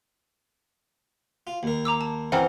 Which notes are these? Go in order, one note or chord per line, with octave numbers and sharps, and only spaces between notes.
F4
D#2 A#4
A#5 D6 E6
A5
E3 C4 A#4 C5 F#5